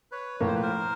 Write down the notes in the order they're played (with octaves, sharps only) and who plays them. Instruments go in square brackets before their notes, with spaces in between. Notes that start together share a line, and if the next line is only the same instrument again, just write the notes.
[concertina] B4 C#5
[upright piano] A2 F3 A#3 [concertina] C#5
[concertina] C5
B4
A#4 C5